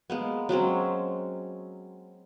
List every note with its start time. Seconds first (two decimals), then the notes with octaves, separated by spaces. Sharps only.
0.10 G#3 A#3 B3
0.49 F#3 G#3 C4 C#4